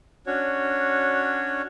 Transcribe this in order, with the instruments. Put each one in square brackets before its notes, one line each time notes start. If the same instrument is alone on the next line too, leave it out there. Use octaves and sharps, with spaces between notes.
[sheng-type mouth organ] C#4 D4 F#4 C#5